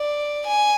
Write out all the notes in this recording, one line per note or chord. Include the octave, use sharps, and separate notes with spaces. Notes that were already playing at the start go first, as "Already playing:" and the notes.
Already playing: D5
G#5